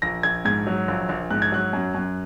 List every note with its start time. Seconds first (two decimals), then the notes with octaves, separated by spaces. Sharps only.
0.02 A#1 A#6
0.23 A#1 G#6
0.45 G#2 G#6
0.67 F#3
0.88 A#1
1.09 A#1
1.31 G#2 F#6
1.42 G#6
1.52 F#3 F#6
1.73 F#2
1.95 F#2